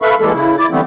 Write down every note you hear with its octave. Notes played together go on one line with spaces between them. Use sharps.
A4 B4 E5 F5 B5 C#6
E3 G3 G#3 A#3 A4
C#3 E4
E4 D5 D6
D3 E3 G3 A3 B3 C4